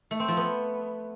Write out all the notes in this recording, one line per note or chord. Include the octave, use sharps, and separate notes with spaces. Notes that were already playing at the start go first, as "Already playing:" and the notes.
A3
C4
F3
B3